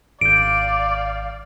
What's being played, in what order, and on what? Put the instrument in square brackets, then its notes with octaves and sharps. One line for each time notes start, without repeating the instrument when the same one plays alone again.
[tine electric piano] G#1 G6 [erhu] D5 [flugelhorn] F5 [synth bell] D7